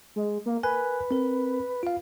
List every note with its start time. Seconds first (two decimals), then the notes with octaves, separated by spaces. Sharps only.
0.16 G#3
0.46 A#3
0.63 A#4 B4 G#5 F#6
1.11 C4 A#4
1.83 F4 F5